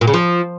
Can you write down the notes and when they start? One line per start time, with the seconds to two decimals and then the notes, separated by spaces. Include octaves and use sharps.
0.01 A#2
0.07 C#3
0.14 F3